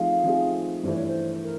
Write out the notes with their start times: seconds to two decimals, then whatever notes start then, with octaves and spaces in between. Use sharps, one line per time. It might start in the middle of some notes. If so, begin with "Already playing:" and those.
Already playing: F3 A3 C4 D#4 G#4 F5
0.24 F3 A3 C4 D#4 G#4
0.83 G2 E3 A3 C5
0.96 C#5
1.07 C5
1.43 A#4